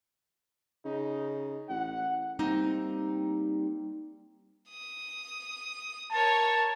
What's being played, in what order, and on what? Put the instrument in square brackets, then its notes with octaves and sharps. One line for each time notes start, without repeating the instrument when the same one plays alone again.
[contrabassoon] C#3 [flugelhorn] D#4
[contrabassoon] A1 [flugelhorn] F#5
[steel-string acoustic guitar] G3 A#3 C4 D#4
[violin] D#6
[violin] A#4 C#5 [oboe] A5